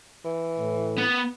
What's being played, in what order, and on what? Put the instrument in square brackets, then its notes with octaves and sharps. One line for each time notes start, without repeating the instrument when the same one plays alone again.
[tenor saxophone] E3
[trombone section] A2
[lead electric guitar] B3